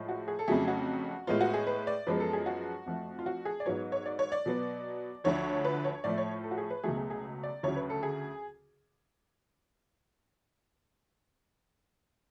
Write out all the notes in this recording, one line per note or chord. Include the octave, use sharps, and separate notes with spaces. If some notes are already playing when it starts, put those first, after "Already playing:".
Already playing: A2 F3 G#3
F#4
G#4
A4
F2 C#3 F#3 A3 G#4
F#4
A2 G#3 B3 F4
F#4
G#4
B4
D5
F#2 F3 G#3 B3 B4
A4
G#4
F#4
F2 F3 A3
F4
F#4
G#4
D5
G#2 F#3 B3 C#5
C#5
D5
C#5
D5
B2 F#3 B3
D2 D3 F3 C#5
B4
C#5
A2 F3 A3 D5
C#5
A4
F#4
G#4
B4
C#2 B2 F#3 A3 G#4
G#4
G#4
D5
D2 C#3 F#3 C#5
B4
A4
G#4